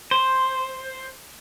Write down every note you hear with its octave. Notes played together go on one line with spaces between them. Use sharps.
C5